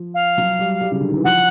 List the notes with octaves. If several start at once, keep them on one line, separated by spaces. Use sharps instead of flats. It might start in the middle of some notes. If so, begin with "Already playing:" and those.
Already playing: F3
F5
F#3
G3
G3
C#3
D3
D#3
E3
F3 F#5